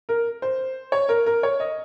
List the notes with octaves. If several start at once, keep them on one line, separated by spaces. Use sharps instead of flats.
A#4
C5
C#5
A#4
A#4
C#5
D#5